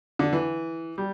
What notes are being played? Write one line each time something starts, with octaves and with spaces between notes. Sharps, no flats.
D3
E3
G3